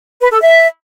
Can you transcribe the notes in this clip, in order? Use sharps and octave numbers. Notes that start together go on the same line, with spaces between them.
B4
A4
E5